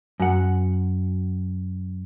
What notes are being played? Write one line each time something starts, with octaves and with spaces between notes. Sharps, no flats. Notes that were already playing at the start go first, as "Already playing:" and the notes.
F#2 F#5